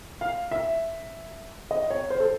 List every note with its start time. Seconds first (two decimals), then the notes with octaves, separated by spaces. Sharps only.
0.21 F5
0.51 E5
1.71 D#5
1.90 C#5
2.10 C5
2.20 A4